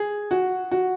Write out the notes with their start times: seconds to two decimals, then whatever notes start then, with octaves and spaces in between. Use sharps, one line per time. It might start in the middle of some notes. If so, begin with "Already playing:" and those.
Already playing: G#4
0.31 F#4
0.71 F#4